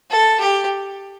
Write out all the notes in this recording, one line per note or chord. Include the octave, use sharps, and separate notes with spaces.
A4
G4